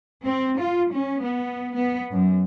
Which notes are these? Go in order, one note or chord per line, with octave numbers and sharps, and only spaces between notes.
C4
F4
C#4
B3
B3
F#2